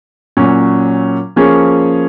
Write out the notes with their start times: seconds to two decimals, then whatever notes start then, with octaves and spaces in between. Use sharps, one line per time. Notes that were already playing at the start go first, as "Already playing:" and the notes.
0.37 A#2 F#3 C#4
1.36 F3 A#3 C#4 G#4 C#5